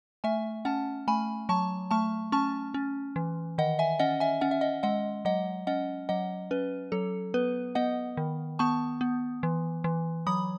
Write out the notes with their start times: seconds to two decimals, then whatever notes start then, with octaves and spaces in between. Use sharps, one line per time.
0.24 A3 E5 G#5
0.65 C#4 F#5 A5
1.08 A3 G#5 B5
1.49 F#3 A5 C#6
1.91 A3 A5 C#6
2.32 C#4 A5 C#6
2.74 C#4
3.16 E3
3.58 D#3 D#5 F#5
3.79 E5 G#5
3.99 C#4 D#5 F#5
4.20 E5 G#5
4.41 C#4 F#5
4.51 E5
4.61 D#5 F#5
4.83 G#3 D#5 F#5
5.25 F#3 D#5 F#5
5.67 C#4 D#5 F#5
6.09 F#3 D#5 F#5
6.51 C#4 B4
6.92 F#3 A4
7.34 B3 B4
7.75 B3 D#5 F#5
8.17 D#3
8.59 B3 A5 C#6
9.01 B3
9.43 E3
9.84 E3
10.27 F#3 B5 D#6